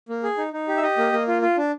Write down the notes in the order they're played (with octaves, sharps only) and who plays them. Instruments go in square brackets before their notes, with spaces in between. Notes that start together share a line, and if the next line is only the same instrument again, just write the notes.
[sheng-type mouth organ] A#3
G#4
D#4
D#4
G4
E5
G4 D#5
A#3
A#3
F4
F4
D4